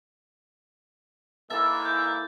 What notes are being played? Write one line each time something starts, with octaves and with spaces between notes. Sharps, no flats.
G#2 E3 A#3 E4 A4 E5 A6
G6